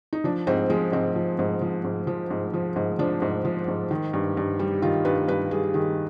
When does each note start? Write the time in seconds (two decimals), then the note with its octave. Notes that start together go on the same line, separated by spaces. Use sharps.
0.13 D#4
0.24 F3 D4
0.47 G#2 C4
0.70 F3 G#3
0.92 G#2 C4
1.16 F3
1.39 G#2
1.61 F3
1.84 G#2
2.07 F3
2.30 G#2
2.54 F3
2.76 G#2
2.99 F3 D4
3.22 G#2
3.45 F3
3.68 G#2
3.91 D#3
4.13 G2
4.37 G2
4.59 G3
4.82 D#3 F4
5.05 G2 B4
5.28 G2 B4
5.51 G3 G#4
5.74 D#3 G#4